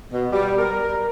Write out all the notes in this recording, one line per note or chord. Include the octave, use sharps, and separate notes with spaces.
B2
G3
A#4